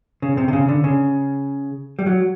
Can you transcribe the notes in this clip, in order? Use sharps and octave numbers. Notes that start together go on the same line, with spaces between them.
C#3
C3
C3
C#3
D3
C#3
G3
F#3